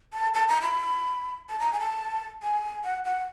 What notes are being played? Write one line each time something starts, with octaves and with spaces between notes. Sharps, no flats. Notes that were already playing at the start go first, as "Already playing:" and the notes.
A5
A5
A#5
B5
A5
A#5
G#5
A5
G#5
F#5
F#5